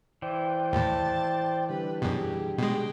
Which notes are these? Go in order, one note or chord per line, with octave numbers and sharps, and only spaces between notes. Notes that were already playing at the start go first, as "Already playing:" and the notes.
E3 C5 D5 G5
D#2 A2 A5
D3 G3 B4
F#2 B2 G4 G#4
B2 G#3 G#4 G5